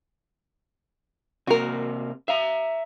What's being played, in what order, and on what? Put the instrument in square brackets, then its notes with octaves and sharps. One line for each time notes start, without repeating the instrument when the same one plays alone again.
[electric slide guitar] C3 A#3 [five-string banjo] F#4 A#4
[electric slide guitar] E5 A#5 [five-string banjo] F5